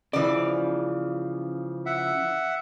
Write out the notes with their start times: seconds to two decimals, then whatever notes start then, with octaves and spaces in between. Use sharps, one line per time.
0.13 C#3 E3 F3 D5
1.86 E5 F#5